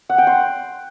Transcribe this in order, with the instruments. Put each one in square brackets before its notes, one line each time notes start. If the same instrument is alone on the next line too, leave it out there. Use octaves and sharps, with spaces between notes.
[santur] F#5
G5
C6